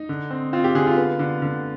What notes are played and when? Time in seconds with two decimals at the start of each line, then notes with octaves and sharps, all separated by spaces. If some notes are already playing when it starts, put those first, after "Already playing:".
Already playing: D#4
0.09 D3
0.31 C4
0.53 C4 F4
0.64 G4
0.75 D3 G#4
0.86 F4
0.97 B3
1.19 D3
1.42 D3